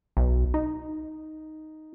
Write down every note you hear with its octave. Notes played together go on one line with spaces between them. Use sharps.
B1
D#4